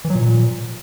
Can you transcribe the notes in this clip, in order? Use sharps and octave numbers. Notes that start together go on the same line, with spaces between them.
E3
F#3
A#2